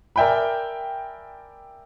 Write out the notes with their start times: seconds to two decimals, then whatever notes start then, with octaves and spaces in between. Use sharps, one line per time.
0.16 A#4 D5 E5 G5 G#5 B5